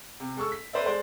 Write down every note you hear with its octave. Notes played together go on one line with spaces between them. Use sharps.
C3
G#3 A4 C#6 E6
B6
A4 B4 C5 D5 E5
G#3 A4 C5 D5